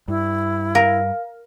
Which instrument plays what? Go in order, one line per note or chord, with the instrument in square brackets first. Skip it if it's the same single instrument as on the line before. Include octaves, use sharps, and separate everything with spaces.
[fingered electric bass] G2 [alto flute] E4
[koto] A#4 [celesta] F5